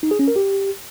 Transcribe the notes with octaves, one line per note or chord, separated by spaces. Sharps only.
D#4
G#4
C#4
A#4
G4